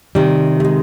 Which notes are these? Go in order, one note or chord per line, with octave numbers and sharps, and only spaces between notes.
C3 D#3 G3
A3
G#3